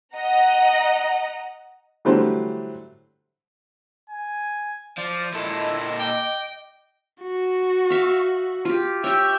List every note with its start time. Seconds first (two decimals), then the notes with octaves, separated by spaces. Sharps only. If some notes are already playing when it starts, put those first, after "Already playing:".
0.15 D#5 F#5 A#5
2.05 D3 E3 F#3 G3 A3 C5
4.10 G#5
4.98 F3 D5
5.34 A#2 E4 A4 D#5
6.00 G5 D6
7.22 F#4
7.90 E5 F5
8.65 F4 G4
9.04 G4 C#5 E5 G5